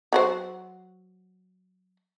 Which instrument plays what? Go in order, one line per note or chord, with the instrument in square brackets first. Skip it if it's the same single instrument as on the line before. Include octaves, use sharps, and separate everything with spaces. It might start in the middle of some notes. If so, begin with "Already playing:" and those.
[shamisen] F#3 F#4 C5